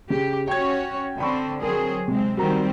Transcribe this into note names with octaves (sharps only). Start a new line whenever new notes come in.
C#3 G4
C#4 F#4 C#5 G5 G#6
D3 C4 G5 B5 C#6
F#3 C4 G#4 A#4
C3 G#3 C4
D#3 G3 C4 F#4 A#4 A#5